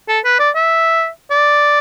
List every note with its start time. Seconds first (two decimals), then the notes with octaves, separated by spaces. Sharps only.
0.08 A4
0.24 B4
0.39 D5
0.55 E5
1.31 D5